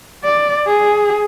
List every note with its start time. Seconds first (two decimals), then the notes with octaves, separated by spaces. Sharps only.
0.24 D5
0.67 G#4